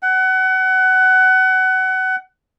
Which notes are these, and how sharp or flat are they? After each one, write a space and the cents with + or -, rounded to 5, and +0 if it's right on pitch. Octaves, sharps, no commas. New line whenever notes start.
F#5 +25